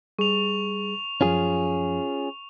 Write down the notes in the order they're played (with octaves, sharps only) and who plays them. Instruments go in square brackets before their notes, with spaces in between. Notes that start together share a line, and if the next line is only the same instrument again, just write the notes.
[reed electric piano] G3 G#4 [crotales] C#6 F7
[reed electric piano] F#2 F3 [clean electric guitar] C#4 F4 G#4